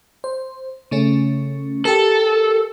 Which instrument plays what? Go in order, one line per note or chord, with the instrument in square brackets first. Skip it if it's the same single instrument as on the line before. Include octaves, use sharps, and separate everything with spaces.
[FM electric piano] C5
C#3 A3 C#4
[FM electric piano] G4 A#4 [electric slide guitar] A4